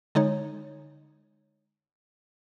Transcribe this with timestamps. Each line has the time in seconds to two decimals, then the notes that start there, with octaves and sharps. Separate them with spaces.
0.15 D3 G#3 D#4 C#5